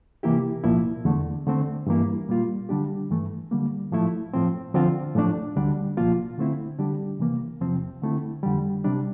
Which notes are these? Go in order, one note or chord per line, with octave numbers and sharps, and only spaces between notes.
C3 E3 A#3 E4 G4
C2 A#2 F3 A#3 E4
E2 D3 A3
D3 A3 C4
G2 E3 A#3 E4
A#2 G3 A#3 F4
D3 G3 D4 G4
G2 E3 A3
D3 G3 A#3
A2 F3 A3 E4
A2 F3 C4
D3 F3 C4 F4
A2 F3 A3 D4
D2 D3 G3 D4
C2 A#2 F3 A#3 F4
D3 A3 C4 E4
D3 G3 D4 G4
C3 E3 A#3
E2 C3 F3 C4
D3 A3 C4 E4
F2 D3 G3
C3 G3 D4